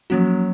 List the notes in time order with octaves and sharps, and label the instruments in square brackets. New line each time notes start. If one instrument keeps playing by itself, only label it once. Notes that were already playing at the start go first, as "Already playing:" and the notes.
[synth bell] F3 A#3 C#4 F#4 [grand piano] F#3